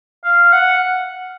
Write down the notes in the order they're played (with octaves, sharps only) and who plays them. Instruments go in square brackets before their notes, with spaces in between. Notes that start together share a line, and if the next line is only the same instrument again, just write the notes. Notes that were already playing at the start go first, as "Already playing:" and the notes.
[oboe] F5
F#5